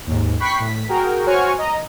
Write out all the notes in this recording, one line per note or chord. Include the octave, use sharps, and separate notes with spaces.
D#2 G#2
G5 B5 C#6 F#6 B6 C7
A2 B6
F#4 G#4 A#4 G5
F#4 C5 C#5 G#5 C#6 F6
D#5 A#5